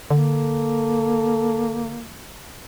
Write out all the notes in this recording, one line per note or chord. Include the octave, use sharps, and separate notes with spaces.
D3 A#3 A4